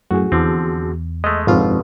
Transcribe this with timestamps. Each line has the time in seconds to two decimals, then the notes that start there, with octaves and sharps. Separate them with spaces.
0.11 F#2 A2 F#4 G#4
0.32 E2 D3 F3 C4
1.24 G#3 A3 D#5 D#6
1.47 G1 F2 G#2 B2 F3 C4 F4